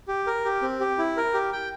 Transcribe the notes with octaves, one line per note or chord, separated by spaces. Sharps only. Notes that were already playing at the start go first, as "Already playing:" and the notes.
G4
A#4
G4
C4
G4
E4
A#4
G4
G5